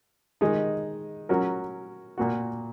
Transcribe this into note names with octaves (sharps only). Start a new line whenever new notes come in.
D#3 G#3 D#4
F#3 C#4 F#4 A#4
A#2 A#3 F#4